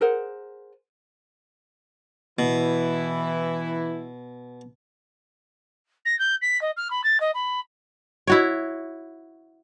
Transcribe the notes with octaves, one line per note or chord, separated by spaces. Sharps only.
G#4 A#4 C5 F#5
B2 E3 E4
A#6
G6
B6
D#5
F6
B5
A6
D#5
B5
E4 F#4 C#5